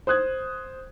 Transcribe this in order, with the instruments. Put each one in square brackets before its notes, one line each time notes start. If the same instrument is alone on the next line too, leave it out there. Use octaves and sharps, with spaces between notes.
[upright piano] C5 D#6 F#6 G#6